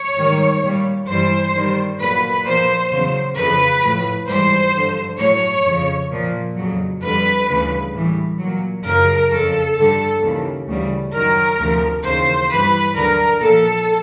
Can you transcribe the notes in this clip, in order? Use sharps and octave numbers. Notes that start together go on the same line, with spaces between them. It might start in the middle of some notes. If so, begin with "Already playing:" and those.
Already playing: C#5
G#2 D#3 G3
A#2 G3
G2 E3 G3 C5
G2 D#3 G3
A#2 F#3 B4
A#2 F3 C5
E2 C#3 F#3
F2 C#3 F3 B4
A2 F3
G#2 E3 G3 C5
G2 D3 F3
A2 F#3 C#5
F2 C#3 F3
A#2 F3
F2 C#3 F#3
F2 D3 G3 B4
D2 C#3 E3 G3
A2 E3 G3
A#2 F#3
F#2 C#3 F3 A#4
F2 C#3 F3 A4
G2 D3 G3 A4
D#2 C#3 E3
D2 C#3 E3 G3
F#2 D#3 F#3 A#4
D2 C3 F3
D#2 C#3 E3 C5
G2 E3 G3 B4
D2 D3 F#3 A#4
A#2 F3 A4